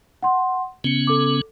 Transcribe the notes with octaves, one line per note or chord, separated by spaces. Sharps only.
F#5 C6
C#3 B3 C#4 C#7 G7
A4 D6